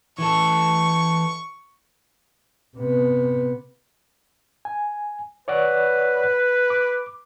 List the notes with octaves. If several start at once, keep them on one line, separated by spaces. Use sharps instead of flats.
E3 A4 C#6
C3 B3
G#5
B4 C#5 D5 F#5
D6